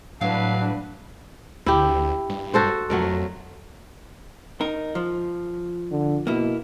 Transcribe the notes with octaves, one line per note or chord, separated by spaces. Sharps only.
A2 F#3 D4 B4 F5
D2 E4 G4
G2
F#4 A4 C5
F2 F#3 A3 A#4
D#4 A#4
F3
D3
B2 A#3 E4